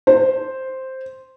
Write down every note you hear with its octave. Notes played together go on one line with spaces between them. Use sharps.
C5